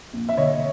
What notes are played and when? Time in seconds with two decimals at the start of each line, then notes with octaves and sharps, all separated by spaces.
0.13 A#1
0.29 E5
0.37 D3 C#5 D#5